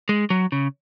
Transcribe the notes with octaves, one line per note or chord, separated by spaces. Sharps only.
G#3
F#3
C#3